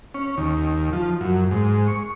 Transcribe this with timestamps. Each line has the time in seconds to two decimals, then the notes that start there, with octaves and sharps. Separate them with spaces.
0.15 C#4
0.37 D#2
0.93 F3
1.21 F#2
1.51 G#2
1.88 C#6